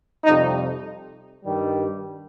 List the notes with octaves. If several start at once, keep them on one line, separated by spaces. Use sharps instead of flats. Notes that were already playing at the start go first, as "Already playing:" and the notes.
F2 C3 G3 D#4
G2 D#3 G3